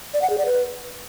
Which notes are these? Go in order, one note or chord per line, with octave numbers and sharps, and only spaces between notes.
D5
F#5
G#4
D5
B4